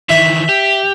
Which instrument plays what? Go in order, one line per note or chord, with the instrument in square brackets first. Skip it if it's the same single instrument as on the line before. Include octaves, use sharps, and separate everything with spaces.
[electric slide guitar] D#3 E3 [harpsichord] E5
[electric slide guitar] G4